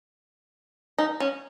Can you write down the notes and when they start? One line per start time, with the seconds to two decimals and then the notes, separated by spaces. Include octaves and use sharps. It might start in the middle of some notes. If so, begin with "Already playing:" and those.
0.98 D#4
1.20 C#4